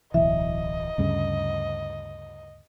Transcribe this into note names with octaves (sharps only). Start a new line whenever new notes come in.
D1 B1 E3 D#5 E5
D2 G2 C#3